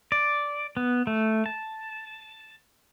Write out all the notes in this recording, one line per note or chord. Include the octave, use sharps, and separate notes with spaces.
D5
B3
A3
A5